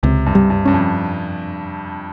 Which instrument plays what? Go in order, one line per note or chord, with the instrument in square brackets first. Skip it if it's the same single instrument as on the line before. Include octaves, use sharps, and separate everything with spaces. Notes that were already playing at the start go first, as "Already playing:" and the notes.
[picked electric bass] C#2 [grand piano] C3
[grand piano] G2
[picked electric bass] G3
[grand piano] G2
[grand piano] G2 [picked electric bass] C#4
[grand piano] F2